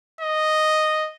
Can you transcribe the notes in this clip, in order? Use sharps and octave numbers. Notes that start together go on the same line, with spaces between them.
D#5